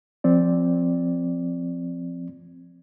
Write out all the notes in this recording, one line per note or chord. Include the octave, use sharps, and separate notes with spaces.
F3 C4 D5